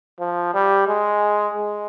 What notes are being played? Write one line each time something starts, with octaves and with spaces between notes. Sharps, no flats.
F3
G3
G#3
G#3